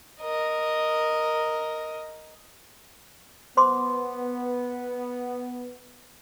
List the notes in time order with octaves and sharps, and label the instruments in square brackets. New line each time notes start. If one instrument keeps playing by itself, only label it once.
[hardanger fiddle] A#4 D#5
[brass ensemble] B3 [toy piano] C5 C6 D6